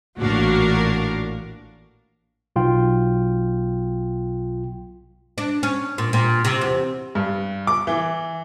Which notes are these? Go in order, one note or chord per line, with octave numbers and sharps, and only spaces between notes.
A1 A#2 D4 F#4 A#4 F5
B1 F4 G5
D4
C#4
A#2
A#2
C3
E2
G2
D6
E3